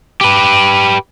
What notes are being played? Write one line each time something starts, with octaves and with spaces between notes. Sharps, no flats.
G4 B4